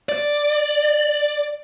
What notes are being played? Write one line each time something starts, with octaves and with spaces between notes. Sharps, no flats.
D5